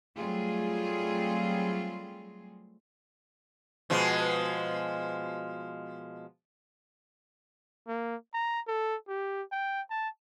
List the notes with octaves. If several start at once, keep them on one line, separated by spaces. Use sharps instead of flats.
F#3 G3 A3 C4 F4 G#4
B2 F3 G#3
A#3
A#5
A4
G4
G5
A5